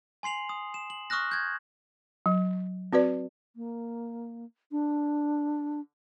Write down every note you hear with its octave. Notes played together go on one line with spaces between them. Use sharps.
G#5 C6 C7 F7 F#7
D#6
E7
F#7
C#6 D#6 F6 F#6 A#6
G6 G#6
F#3
C4 F#4 B4 D5
A#3
D4